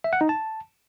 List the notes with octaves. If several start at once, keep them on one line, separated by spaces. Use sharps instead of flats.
E5
F#5
D#4
A5